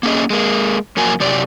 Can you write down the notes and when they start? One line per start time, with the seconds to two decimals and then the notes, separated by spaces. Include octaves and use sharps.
0.03 A#3 C#4 G#4 D#5
0.30 G#3 A#3
0.97 F2 F#3 A#3 G#5
1.20 F#2 C3 G4 D5